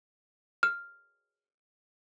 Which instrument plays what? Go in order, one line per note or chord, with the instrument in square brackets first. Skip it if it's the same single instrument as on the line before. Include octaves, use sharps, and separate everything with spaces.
[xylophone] F6